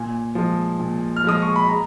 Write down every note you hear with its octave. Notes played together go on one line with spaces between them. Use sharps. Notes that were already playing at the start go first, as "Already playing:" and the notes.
Already playing: A#2 G#5
F3 G#3
A#2
F6
F3 G#3 D#6
C#6
B5
A#5